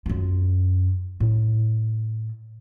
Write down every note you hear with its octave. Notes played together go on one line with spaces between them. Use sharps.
F#2 F4
A2